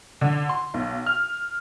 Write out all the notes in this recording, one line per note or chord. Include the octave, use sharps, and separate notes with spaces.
D3
C6
B1
F6